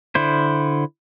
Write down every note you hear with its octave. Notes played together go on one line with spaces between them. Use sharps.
D3 E4 C5